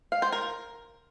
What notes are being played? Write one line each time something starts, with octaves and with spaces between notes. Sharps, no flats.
F5
C5
A#4